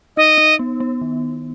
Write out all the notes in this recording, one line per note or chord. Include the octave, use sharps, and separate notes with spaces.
D#4 D#5
D#4
B3
B3
D#3